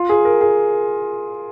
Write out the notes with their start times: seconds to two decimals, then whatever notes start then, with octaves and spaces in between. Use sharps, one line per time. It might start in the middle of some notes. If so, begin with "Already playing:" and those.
Already playing: F4
0.09 G#4
0.25 A#4
0.41 G#4